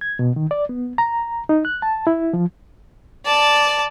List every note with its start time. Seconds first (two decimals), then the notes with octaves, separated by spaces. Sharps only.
0.01 G#6
0.19 B2
0.36 D#3
0.51 D5
0.69 B3
0.98 A#5
1.49 D#4
1.65 F#6
1.82 A5
2.07 E4
2.33 F3
3.26 D5 A5